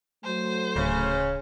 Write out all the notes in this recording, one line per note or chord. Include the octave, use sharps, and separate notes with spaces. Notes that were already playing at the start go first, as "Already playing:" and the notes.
F#3 A3 C5
D1 C#3 C#4